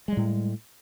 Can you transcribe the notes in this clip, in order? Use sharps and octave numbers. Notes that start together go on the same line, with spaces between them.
A2 G3 G#3